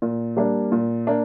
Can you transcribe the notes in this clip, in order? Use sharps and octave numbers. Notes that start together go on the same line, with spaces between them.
A#2
G3 A#3 D4
A#2
A#3 D4